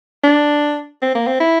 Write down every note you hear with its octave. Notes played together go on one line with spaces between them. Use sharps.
D4
C4
A#3
C4
E4